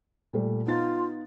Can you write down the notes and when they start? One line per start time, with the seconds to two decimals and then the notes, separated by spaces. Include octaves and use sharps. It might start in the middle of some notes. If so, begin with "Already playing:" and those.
0.33 A#2 G3 A3
0.66 B3 D#4 F4 A6